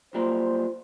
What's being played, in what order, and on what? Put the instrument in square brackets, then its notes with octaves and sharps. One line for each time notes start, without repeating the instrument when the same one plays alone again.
[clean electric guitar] F#3 G3 A#3 [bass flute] F4 [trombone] C5